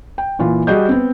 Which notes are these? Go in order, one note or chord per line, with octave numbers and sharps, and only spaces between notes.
G5
A#2 E3 F4
G3 F#4 G#4 D#5 G6
B3 C4